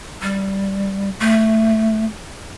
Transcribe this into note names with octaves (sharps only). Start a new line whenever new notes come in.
G3
A3